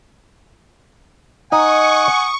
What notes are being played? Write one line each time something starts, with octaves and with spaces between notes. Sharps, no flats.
D#4 D#5 F#5 G#5 C#6 D#6